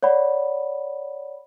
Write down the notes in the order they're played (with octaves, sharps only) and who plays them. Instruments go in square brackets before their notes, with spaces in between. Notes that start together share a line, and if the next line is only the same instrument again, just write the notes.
[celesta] C#5 D5 F#5 B5